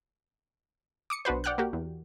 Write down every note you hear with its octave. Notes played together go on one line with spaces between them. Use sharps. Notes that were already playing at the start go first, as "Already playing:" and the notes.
D6 D#6 C#7
B1 D4 F#4 B4 C5
D5 F#5 G5 F6 F#6
A#3 F#4 G4
E2